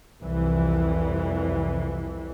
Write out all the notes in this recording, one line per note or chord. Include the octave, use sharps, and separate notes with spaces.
C2 F2 E3